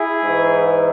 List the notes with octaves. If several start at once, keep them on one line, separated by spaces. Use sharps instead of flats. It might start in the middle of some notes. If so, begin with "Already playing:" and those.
Already playing: E4 G#4
G#2 E3